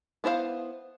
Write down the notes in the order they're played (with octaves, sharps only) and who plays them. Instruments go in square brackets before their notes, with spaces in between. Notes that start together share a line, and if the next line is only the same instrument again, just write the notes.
[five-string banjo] B3 E4 C5 D5 F5